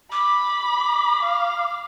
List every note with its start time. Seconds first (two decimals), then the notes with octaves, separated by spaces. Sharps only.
0.12 B5 D6
1.22 F5